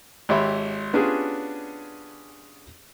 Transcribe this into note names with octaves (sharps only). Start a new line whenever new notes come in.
G#1 G4 C#5 E5 B5
B3 C#4 D4 F4 G4 G#4